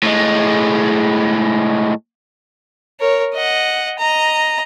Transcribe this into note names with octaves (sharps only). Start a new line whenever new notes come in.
A2 G#3
A#4 C#5
D#5 F#5
D#5 A#5